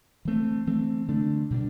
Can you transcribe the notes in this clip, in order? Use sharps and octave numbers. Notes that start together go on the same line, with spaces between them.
E3 A3 C4
E3 A3 C4
D3 A3 D4
B2 G3 D4